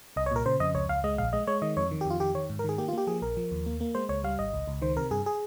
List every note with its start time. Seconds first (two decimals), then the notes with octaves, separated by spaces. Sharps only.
0.16 C2 D#5
0.26 C#5
0.31 A#2 A#4
0.46 C#3 C5
0.60 F2 D#5
0.75 C#2 C#5
0.89 C#2 F5
1.04 G#3 D#5
1.18 A#1 F5
1.33 G#3 D#5
1.47 G#3 C#5
1.62 D#3 D#5
1.77 F2 C#5
1.91 D#3
2.01 G4
2.05 F2 F4
2.20 D#3 G4
2.35 D#3 C#5
2.50 G#2
2.59 A#4
2.64 D#3 G#4
2.78 A#3 G4
2.88 F4
2.93 A#3 G4
3.07 F3 G#4
3.22 A#1 A#4
3.37 F3
3.51 D#2
3.66 A#3
3.81 A#3
3.95 G#3 C5
4.09 C#2 C#5
4.24 G3 F5
4.39 G#1 D#5
4.53 C#2
4.67 C#2
4.82 D#3 C5
4.97 C3 A#4
5.11 G2 G#4
5.26 G#4